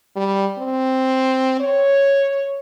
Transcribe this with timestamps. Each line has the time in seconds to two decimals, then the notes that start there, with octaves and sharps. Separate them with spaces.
0.16 G3
0.58 C4
1.60 C#5